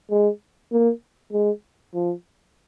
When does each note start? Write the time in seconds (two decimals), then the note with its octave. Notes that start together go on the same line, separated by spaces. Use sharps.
0.10 G#3
0.72 A#3
1.32 G#3
1.94 F3